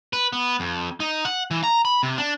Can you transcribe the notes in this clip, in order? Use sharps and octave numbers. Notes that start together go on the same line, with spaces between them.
B4
B3
F2
D#4
F#5
E3
A#5
B5
C3
D4